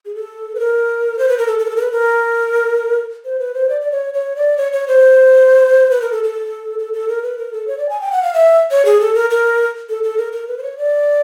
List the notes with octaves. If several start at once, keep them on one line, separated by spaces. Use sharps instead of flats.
G#4
A4
B4
A#4
C5
B4
A#4
A4
A4
A#4
A4
A#4
B4
A#4
C5
B4
C5
D5
D5
C#5
C#5
D5
C#5
C#5
C5
B4
A#4
A4
A4
A4
A4
A#4
B4
A#4
A4
C#5
D5
G#5
G5
F#5
F5
E5
C#5
G#4
A4
A#4
A#4
A4
A4
A#4
A#4
B4
C5
C#5
D5